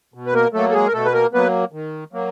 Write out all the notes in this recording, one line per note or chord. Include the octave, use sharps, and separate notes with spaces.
B2
B4
A#3 A#4
F#3 A3 A#3 A4
A4
G#3 G#4
A#4
B2 A3 A4
B4
A#3 A#4
F#3 A#3 B3 B4
D#3
F#3 A#3